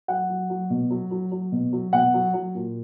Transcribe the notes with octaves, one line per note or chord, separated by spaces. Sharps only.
F#3 F#5
F#3
F#3
B2
F#3
F#3
F#3
B2
F#3
B2 F#5
F#3
F#3
A#2